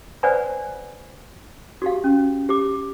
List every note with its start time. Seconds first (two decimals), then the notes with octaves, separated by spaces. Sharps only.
0.23 B4 C5 D5 F#5 G#5 B5
1.82 F#4 G4 F5
2.04 C#4
2.49 G4 D6